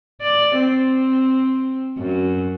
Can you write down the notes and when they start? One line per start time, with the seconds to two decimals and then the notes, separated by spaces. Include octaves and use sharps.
0.21 D5
0.59 C4
1.98 F#2